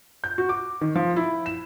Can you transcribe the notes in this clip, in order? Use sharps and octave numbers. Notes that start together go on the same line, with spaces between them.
G6
F#4
D6
D#3
F3
E4
E7